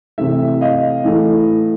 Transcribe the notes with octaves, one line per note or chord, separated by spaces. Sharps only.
C3 E3 A3 E5
D#5 F5
A2 E3 A3